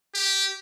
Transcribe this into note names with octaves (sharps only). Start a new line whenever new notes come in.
G4